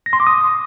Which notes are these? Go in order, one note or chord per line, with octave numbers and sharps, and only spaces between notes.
A#6
C6
D6
D#6